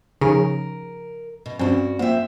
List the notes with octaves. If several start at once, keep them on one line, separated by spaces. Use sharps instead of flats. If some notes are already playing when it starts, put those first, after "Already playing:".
C#3 F3 D#4 A#4
B2
G2 C4 C#4 F#4 C5
A#3 F4 C5 E5 G5